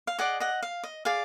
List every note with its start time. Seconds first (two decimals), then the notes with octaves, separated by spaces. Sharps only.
0.07 F5
0.19 G#4 D5 D#5 F#5
0.40 D#5 F#5
0.63 F5
0.83 D#5
1.05 G#4 D5 F5